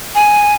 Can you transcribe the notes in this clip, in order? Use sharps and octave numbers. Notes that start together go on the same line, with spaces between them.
G#5